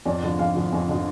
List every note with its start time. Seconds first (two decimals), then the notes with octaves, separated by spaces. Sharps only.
0.06 F2 D5
0.23 D3 F3
0.39 F2 F5
0.55 D3 F3
0.73 F2
0.89 D3 F3